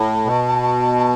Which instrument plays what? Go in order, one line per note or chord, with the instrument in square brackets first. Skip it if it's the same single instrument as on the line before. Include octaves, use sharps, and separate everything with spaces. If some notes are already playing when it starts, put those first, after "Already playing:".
Already playing: [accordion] A2 [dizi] A5
[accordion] B2